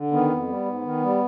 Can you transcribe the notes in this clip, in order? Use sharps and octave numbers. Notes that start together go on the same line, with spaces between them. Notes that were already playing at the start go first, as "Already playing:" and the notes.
Already playing: D3
D#3 B3
F2
G3
G#2
D#3
G3